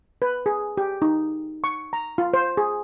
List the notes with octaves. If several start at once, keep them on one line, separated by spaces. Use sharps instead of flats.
B4
G#4
G4
D#4
C#6
A#5
F4
C5
G#4